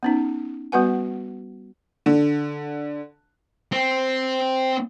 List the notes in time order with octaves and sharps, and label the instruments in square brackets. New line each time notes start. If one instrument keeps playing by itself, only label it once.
[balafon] B3 C#4 D#4
G3 B3 F#4 B4 F#5 G#5
[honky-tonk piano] D3
[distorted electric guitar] C4